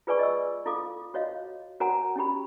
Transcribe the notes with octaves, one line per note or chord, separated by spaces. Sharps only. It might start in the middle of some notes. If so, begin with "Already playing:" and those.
F4 G#4 B4 D5 G#5 C#6
D#5 E6
E4 F4 A4 F5 D6
F#4 C#5 D#5 F5
F#4 A#4 C#5 F#5 G#5 A#5
C#4 E4 G4 B5